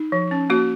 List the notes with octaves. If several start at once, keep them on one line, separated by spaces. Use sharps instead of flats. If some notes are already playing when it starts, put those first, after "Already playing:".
Already playing: D#4
F3
C#4
A#3 F#4